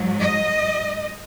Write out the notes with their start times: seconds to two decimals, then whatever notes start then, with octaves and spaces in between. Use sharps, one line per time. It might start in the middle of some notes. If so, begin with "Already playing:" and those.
Already playing: G#2 F#3
0.21 D#5